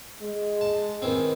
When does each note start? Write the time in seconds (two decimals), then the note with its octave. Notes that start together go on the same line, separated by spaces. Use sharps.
0.21 G#3
0.61 A5
1.02 D#3 E3 C4